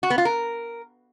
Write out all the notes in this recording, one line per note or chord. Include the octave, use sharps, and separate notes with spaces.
F#4
B3
F4
A#4